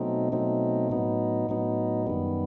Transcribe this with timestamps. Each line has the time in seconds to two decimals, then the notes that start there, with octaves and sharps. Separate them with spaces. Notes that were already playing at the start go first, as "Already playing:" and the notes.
Already playing: B2 F#3 A3 C4 D#4
0.32 B2 F#3 A3 C4 D#4
0.90 A2 F#3 B3 D#4
1.49 A2 F#3 B3 D#4
2.07 F#2 D#3 G3 B3